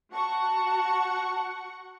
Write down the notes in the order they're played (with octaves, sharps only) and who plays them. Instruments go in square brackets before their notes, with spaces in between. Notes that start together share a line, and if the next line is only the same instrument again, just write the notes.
[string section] F#4 F#5 C#6 [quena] A5